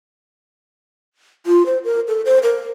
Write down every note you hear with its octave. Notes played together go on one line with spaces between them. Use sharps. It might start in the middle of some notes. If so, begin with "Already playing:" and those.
F4
C5
A#4
A4
C5
A#4